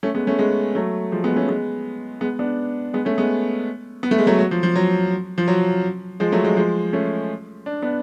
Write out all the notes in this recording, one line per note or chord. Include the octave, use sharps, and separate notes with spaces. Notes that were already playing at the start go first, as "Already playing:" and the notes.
A3 C#4
G#3 B3
A3 C#4
G#3 B3
F#3 A3
F3 G#3
G#3 B3
A3 C#4
G#3 B3
G#3 B3
B3 D4
G#3 B3
A3 C#4
G#3 B3
B3
A3
G#3
F#3 A3
F#3
F3
F3
F#3
F3
F#3
F3 G#3
F#3 A3
F3 G#3
F3 G#3
A3 C#4
D4
B3 D4